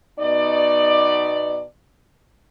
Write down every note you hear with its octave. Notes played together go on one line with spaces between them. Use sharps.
B2 B3 D#4 D5